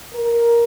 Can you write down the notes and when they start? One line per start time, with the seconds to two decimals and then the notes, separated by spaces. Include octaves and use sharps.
0.12 A#4